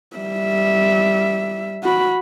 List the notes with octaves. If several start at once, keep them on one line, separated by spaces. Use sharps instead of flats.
G3 E5
F#4 B5